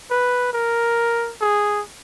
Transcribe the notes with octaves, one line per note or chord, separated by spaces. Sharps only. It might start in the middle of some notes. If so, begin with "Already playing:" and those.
B4
A#4
G#4